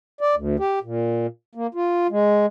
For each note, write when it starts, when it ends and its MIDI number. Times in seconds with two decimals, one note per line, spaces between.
0.21 0.35 74
0.35 0.56 38
0.60 0.79 67
0.83 1.27 46
1.55 1.67 58
1.75 2.07 65
2.10 2.46 56